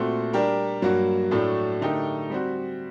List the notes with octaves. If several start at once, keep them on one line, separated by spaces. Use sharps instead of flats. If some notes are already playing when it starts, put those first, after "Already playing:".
Already playing: A#2 A3 C4 F#4
G3 D4 G4 A#4
G2 F#3 A#3 F#4
A2 F#3 A3 D4
D3 A3 D#4 G4 A#4
G3 C4 F#4